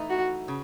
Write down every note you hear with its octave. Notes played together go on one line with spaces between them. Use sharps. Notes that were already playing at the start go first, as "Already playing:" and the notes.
Already playing: E3 A3 D#4
F#4
C#3